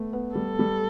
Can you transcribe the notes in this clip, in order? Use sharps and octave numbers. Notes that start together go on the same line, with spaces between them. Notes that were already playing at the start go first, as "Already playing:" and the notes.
Already playing: A3 B3
B3
G3 A4
G3